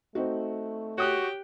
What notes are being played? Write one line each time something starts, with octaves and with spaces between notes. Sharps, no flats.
A3 C4 D#4 F#4
F#4 G4 C#5 G5 D#6 F#6